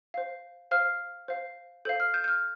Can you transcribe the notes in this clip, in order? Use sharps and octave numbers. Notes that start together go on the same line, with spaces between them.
C5 F5
C5 F5 F6
C5 F5
A4 C5 F5 G6
F6
G6
G6
F6